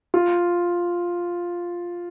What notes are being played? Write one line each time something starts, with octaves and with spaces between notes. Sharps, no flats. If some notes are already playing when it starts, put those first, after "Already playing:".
F4